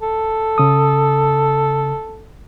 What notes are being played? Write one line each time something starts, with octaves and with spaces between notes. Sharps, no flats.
A4
C#3 D#6